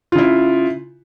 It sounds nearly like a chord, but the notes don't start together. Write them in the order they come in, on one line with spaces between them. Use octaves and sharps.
F4 C#3 E4